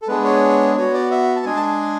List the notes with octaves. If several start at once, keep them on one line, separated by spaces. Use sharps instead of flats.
A4
G#3 B3 D4 G#4 B4
C#5
B3 F#4 C#5
D5
E5
A5
G#3 D4 G#4 G#5
A5
G#5